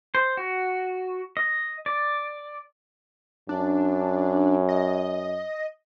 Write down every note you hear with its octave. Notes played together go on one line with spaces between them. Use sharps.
C5
F#4
D#5
D5
F#2 D4
D#5